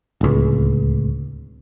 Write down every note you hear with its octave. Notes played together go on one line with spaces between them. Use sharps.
D1 C#2